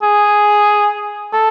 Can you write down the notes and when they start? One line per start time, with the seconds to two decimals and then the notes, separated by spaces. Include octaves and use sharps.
0.02 G#4
1.33 A4